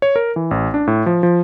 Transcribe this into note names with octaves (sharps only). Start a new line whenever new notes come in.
C#5
A#4
E3
A1
D4
A2
F3
F3